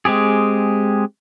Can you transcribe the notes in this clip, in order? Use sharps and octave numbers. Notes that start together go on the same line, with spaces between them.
G#3 C4 G4 G#4